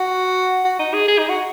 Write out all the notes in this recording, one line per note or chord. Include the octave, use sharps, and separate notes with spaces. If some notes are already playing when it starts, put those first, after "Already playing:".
Already playing: F#4
F#4
D#4
G#4
G#4
D#4
F#4